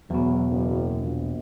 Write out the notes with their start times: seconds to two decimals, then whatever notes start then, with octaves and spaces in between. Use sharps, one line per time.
0.10 E2 B2 F#3
0.51 F#1
1.00 A#1